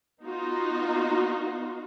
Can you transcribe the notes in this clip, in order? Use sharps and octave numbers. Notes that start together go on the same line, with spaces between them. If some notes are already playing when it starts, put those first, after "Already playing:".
B3 D#4 F4 F#4